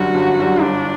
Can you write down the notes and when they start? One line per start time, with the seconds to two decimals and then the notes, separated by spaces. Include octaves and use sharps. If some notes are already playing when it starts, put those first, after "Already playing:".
Already playing: F#2 D3 G3 F#4
0.14 G1
0.38 F#2 D3 G3
0.62 G1 D4